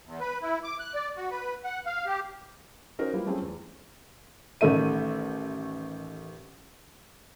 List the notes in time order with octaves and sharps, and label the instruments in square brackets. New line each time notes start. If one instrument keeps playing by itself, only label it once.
[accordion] E2
B4
E4
D6
F#6
D5
F#4
B4
F#5
F5
G4
[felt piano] C#4 D#4 F#4 A#4 C5
G3 A#3 B3 E4 F4 G4
G3 A3 C4 C#4 F4 G#4
E2
A1 D#3 A3 E5 D#7